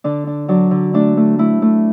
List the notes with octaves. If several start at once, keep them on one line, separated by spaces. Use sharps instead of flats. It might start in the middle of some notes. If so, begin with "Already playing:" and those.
D3 D4
D4
F#3 D4
D3
A3 D4
A3
A3 E4
A3